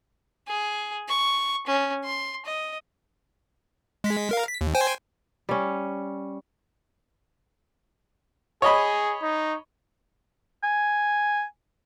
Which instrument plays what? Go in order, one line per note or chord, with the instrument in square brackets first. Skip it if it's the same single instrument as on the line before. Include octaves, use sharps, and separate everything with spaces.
[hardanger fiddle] G#4
C#6
C#4
C6
D#5
[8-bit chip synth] G#3 B6
A#4 F5
B6
D#2
C5 G5 G#5
[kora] G3 C#4
[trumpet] G#4 [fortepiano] C#5 D#5 B5
[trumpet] D#4
[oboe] G#5